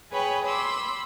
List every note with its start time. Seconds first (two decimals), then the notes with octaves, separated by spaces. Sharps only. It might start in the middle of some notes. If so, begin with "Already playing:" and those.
0.12 G#4 B4 C#5 G5 B5
0.46 B5 C6 D6 E6